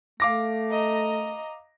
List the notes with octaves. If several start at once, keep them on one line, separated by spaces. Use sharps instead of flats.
A3 F5 D6 A#6
D#5 A#5